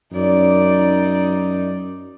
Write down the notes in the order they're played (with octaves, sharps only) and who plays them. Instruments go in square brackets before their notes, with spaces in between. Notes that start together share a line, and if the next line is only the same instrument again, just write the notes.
[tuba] F#2 [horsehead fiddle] D#4 D5